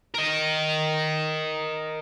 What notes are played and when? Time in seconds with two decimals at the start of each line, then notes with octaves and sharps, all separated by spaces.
0.15 A#4 D#5